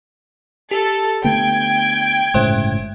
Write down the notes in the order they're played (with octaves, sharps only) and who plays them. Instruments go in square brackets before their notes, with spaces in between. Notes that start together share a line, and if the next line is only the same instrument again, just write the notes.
[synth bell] G4 [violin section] A4
[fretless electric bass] D3 A3 B3 [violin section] G5 G#6
[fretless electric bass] G1 A2 C#3 [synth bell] G#3 C5 E5